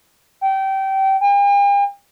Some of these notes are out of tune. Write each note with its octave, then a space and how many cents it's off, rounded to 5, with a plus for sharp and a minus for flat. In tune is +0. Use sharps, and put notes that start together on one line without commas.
G5 -25
G5 +45